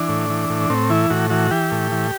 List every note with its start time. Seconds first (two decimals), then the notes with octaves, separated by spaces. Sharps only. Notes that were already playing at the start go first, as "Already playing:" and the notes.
Already playing: E3 D4
0.09 A2
0.30 E3
0.50 A2
0.70 A2 C4
0.90 E3 E4
1.10 A2 F#4
1.30 E3 F#4
1.51 E3 G4
1.71 A2
1.92 E3